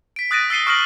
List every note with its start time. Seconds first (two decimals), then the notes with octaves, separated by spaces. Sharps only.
0.16 B6 D7
0.31 D#6 F#6 A6 A#6 D7 D#7
0.50 E6 A6 C7 D#7 G7
0.67 C#6 D#6 F6 A#6 D7 F#7